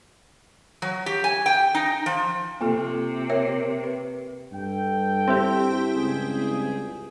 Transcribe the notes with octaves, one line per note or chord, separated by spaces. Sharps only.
F#3
G4
G#5
G5
D#4
F3
C3 A#3 F4 A4
A#4 C#5 E5
B4
G2 A4 G5
C4 E4 G4
C#2 G2 G#4